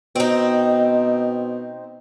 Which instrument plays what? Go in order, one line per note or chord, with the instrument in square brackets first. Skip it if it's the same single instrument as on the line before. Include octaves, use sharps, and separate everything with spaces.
[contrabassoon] B2 [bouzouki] C4 D#4